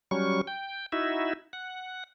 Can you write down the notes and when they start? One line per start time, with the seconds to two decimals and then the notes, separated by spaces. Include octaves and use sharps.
0.11 F#3 G3 C#4 C#6
0.47 G5
0.92 D#4 E4 F#4 E5
1.53 F#5